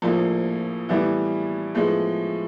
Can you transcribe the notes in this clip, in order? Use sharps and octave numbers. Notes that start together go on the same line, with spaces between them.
A#1 A2 F3 A#3
A2 E3 G3 B3 E4
A2 F3 G#3 B3